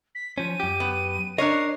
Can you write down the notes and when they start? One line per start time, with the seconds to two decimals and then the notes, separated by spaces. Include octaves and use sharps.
0.15 B6
0.38 F3 C#4 D#7
0.60 F#2 G4
0.80 B3
1.38 D4 A#4 C#5 D#5 C7